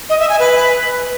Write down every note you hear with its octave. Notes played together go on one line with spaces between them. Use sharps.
D#5
E5
G#5
B4